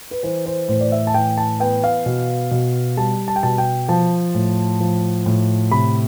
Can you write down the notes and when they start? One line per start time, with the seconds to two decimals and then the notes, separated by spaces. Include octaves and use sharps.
0.11 B4
0.23 E3 C5
0.46 C5
0.69 A2 C5
0.81 D5
0.92 E5
1.07 A5
1.14 E3 G5
1.38 A5
1.60 B3 G5
1.84 F5
2.06 B2
2.51 B2
2.97 G3 A5
3.28 A5
3.36 G5
3.43 B2 A5
3.58 G5
3.89 F3 A5
4.35 A2
4.80 F3
5.26 A2
5.71 C3 B5